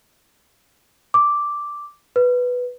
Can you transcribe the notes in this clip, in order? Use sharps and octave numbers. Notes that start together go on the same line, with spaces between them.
D6
B4